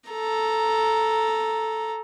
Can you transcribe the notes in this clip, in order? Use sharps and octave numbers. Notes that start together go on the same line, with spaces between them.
A4 A#5